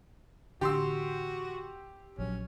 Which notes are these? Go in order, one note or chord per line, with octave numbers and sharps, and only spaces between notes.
A1 D3 D4 F#4 G4 C6 E6
A#1 F#3 C#4